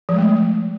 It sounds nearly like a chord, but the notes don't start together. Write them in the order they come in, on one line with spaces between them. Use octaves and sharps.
F3 G#3 A3